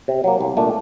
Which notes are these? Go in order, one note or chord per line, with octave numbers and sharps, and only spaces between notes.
C3
F#3 A#3
C2
A#2 A3 D4